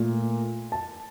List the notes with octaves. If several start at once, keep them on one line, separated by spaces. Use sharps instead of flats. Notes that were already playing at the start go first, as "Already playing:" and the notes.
Already playing: A#2 A3
A5